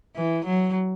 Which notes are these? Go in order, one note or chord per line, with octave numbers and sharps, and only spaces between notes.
E3
F#3